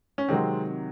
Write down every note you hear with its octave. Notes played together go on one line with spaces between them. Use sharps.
C#4
C3 D#3 F#3 G#3 C4